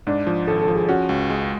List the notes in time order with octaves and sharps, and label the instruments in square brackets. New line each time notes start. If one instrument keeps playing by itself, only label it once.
[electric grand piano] G#2 [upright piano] D4
[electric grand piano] F3
[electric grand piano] G#1 [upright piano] A4
[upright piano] A4
[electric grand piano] F3
[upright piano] G#4
[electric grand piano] C#4 [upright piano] F#4
[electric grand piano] C#2
G#3